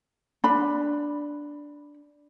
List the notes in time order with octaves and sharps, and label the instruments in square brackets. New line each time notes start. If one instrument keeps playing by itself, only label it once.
[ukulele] D4 B5